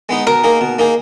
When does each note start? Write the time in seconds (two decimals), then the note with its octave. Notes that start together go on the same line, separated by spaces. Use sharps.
0.09 G#3 B3 D#4
0.27 B2 A#4
0.44 A#3 D#4 G#4
0.61 B2
0.78 A#3 D#4 G#4